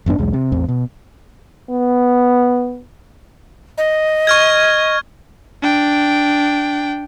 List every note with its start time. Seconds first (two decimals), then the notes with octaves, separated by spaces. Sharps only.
0.06 G#1 F#2 B3 D4
0.18 B1 E2 G#3
0.33 C3
0.52 A1 E2 C4
0.68 B2
1.70 B3
3.78 D#5
4.27 C#6 F6 G#6
5.62 D4 G5